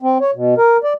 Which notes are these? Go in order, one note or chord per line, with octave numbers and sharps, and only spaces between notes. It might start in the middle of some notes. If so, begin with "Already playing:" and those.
C4
C#5
B2
A#4
D5